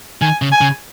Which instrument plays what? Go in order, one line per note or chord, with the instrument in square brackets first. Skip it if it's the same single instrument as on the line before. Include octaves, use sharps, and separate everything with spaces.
[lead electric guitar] D#3 [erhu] G#5
[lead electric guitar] C#3
[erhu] G#5
[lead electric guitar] C#3